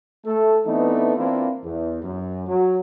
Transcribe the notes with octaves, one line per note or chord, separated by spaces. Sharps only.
A3 A4
E3 A3 B3 C4 D4 D#4
E3 A#3 C4 D4 E4 F4
E2
F#2
F#3